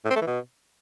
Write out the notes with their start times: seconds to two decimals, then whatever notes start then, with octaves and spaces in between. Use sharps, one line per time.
0.05 A2
0.11 C4
0.16 A3
0.22 E3
0.27 B2